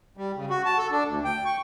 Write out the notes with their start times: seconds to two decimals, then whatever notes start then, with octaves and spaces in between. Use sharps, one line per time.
0.17 G3
0.36 C#3
0.50 F#4
0.65 A5
0.78 A4
0.91 D4
1.07 D2
1.24 G5
1.45 C#6